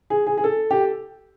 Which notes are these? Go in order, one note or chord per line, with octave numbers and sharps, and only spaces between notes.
G#4
G#4
G#4
A4
G4